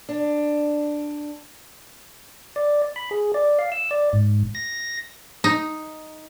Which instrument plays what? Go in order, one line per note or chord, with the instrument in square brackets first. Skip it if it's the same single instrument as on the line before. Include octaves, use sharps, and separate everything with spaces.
[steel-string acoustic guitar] D4
[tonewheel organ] D5
B5
G#4
D5
F5
E6
D5
G#2
A#6
[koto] D#4